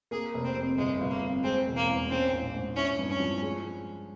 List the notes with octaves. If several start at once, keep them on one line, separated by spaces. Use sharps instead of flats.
A#3 G#4
F1
C4
F2
G1 G#3
G1
A#3
F2
G#3 C4
E1
A#3
E2
C4 C#4
A#1
G#2
C#4 E4
G2
C#4
F3
G#3